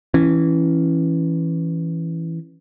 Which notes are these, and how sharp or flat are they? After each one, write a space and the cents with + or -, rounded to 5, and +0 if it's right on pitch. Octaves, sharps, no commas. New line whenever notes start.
E3 +0 C#4 -10